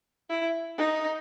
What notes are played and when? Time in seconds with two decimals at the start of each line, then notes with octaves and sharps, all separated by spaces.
0.30 E4
0.78 D#4